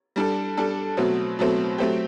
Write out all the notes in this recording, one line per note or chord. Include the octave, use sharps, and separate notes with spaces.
G3 D4 A4
G3 D4 A4
B2 F#3 A3 C4
B2 F#3 A3 C4
F#3 A3 C4 G4